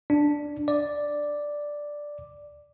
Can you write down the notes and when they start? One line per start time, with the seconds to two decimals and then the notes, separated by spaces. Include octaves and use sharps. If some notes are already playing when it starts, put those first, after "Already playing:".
0.10 D4
0.68 D5